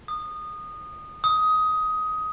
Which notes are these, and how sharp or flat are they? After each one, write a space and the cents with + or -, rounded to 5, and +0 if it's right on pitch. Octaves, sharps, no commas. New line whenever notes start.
D#6 -20
D#6 +15